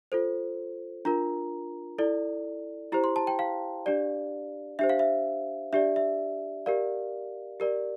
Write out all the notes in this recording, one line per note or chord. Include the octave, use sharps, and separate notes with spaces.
F4 A4 C5
D4 F4 A#4 A#5
E4 A4 D5
E4 G4 C5 A#5
C6
A5
G5
F5
D4 G4 D5
D4 G4 C5 E5
F5
E5
D4 G4 D5 E5
E5
G4 A#4 D5 F5
G4 A#4 D5